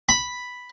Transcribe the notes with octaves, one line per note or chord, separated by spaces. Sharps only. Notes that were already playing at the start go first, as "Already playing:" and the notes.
B5